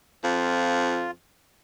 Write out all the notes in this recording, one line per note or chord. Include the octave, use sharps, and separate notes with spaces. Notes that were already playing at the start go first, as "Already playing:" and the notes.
F2 F4